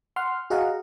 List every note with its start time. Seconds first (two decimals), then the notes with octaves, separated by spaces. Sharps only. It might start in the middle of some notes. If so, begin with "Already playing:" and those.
0.16 F#5 C6 F6
0.50 F#4 G#4 D#5 F5 F#5 A#5